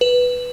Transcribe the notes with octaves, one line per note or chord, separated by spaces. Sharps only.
B4